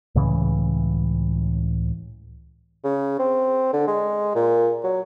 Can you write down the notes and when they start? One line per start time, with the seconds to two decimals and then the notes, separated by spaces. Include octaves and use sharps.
0.15 C#2 A2 C#3 E3
2.84 C#3
3.19 C4
3.73 D3
3.88 G#3
4.35 A#2
4.84 F#3